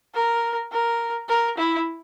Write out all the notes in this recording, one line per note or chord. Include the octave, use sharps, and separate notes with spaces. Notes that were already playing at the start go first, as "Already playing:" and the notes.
A#4
A#4
A#4
E4